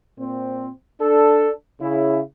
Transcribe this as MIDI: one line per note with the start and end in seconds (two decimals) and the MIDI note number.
0.18 0.69 46
0.18 0.69 60
1.00 1.50 62
1.00 1.50 69
1.81 2.20 49
1.81 2.20 64